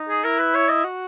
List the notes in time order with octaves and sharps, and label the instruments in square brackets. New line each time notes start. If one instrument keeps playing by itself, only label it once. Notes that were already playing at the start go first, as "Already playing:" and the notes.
Already playing: [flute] D#4
[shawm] G#4
[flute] E4 [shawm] A#4
[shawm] B4
C#5
D#5
[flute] F#4